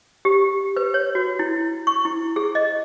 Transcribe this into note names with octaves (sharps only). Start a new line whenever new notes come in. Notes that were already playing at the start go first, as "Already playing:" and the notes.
G4
B4
C#5
F#4
E4
C#6
E4
G#4
D#5